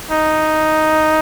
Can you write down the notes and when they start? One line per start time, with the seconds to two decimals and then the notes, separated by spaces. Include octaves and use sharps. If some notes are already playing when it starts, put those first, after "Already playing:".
0.11 D#4